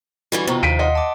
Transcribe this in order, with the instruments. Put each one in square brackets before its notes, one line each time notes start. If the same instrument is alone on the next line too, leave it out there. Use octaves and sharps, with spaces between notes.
[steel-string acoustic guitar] D3 E3 G3 [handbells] F#4
[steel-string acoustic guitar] F2 C3 D#3 [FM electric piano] B3 C#6
[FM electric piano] D#2 [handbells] F5 [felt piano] B6 D7 D#7
[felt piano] D#5 [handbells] F#5 C6
[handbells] A5 D6